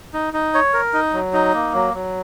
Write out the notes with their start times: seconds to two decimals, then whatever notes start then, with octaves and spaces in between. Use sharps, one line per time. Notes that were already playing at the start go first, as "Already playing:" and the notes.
0.14 D#4
0.34 D#4
0.54 C#5
0.73 A#4
0.94 D#4
1.13 F#3
1.33 D#4
1.54 A#3
1.74 F#3
1.94 F#3